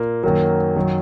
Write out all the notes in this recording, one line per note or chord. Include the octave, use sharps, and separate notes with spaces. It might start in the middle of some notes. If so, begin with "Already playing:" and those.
Already playing: A#2 A#3
F#2 D#3 F#3 A#3
F#2 D#3 F#3